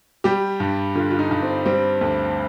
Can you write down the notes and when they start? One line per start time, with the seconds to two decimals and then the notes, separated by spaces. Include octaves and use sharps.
0.24 G3 G4
0.60 G2
0.95 D3 F4
1.11 F4
1.19 D#4
1.31 G2
1.42 C4
1.66 G3 C4
2.01 D2